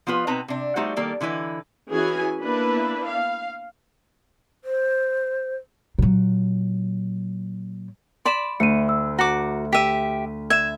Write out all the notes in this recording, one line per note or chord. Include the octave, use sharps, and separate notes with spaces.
F3 B3 F4 B4
B2 C4 D#4 B4 A5 A#5
C3 D4
G3 A3 D#4 F#4 C5
D#3 G3 A#3 A4
D3 E3 E4 B4 D#5
E3 C#4 E4 F#4 G#4 G#5
A#3 B3 D4 E4 B4
F5
C5
A#2 F#3
D5 B5 C6 E7
D2 C#7 D#7
E6
F#4 A#5 D6 C#7
G4 E5 B6 D#7
E5 G#6 E7